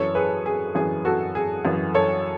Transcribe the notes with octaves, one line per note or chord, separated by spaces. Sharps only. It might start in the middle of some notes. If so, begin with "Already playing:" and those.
Already playing: F#2 E3 A4 C#5
G#4 B4
G#4
F#2 E3 G#4
F#4 A4
G#4
F#2 E3
A4 C#5